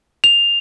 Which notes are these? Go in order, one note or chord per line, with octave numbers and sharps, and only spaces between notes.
F7